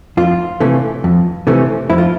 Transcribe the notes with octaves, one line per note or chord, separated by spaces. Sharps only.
F2 F4
C3 E3 A3 C#4
F2
C3 E3 A3 C#4
F2 E4
F4